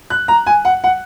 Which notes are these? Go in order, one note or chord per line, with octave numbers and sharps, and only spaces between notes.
F#6
A#5
G#5
F#5
F#5